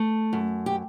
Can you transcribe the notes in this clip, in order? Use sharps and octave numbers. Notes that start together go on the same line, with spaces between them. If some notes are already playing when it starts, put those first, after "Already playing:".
Already playing: A3
F#2
G4